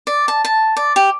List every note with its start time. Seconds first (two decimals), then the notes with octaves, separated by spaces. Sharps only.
0.07 D5
0.28 A5
0.45 A5
0.77 D5
0.96 G4